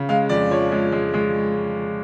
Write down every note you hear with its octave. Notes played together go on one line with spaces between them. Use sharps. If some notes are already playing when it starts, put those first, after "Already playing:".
Already playing: C#3
G#3 F5
F2 D5
F3 C#5
G#3
G#3
G#3